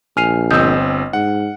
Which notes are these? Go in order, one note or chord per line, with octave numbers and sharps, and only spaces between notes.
A#1 G#5 F6 C7 D#7 F7
G1 C4 D#5 D#6 E6 G6
G#2 F#5